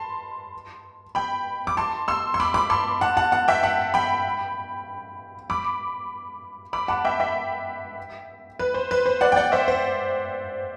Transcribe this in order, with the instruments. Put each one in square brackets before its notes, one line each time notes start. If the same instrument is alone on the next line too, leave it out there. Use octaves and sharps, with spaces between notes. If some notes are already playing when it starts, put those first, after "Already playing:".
Already playing: [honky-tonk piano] A5 B5 C6
G5 B5
D6
A5 C6
C6 E6
C6
B5 D6
B5 D6
A5 C6
F#5 A5
F#5 A5
F#5 A5
E5 G5
F#5 A5
G5 B5
B5 D6
B5 D6
F#5 A5
E5 G5
E5 G5
B4
C5
B4
C5
D5 F#5
G5
D5 F#5
C5 E5
C5